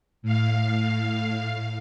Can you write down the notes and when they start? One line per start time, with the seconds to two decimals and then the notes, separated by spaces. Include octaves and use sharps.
0.22 A2 F5